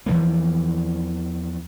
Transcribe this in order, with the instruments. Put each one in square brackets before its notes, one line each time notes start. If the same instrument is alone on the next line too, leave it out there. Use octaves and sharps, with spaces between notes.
[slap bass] E2 E3 F3 A#3